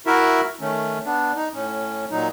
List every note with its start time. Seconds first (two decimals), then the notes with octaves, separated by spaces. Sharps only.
0.07 E4 F#4 A#4 E5
0.61 D#3 A3 C#4
1.05 B3 D4
1.36 D#4
1.54 A2 C#4
2.11 A#2 F#3 D#4